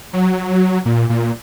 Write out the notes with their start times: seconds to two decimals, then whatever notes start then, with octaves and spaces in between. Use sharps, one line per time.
0.13 F#3
0.86 A#2
1.09 A#2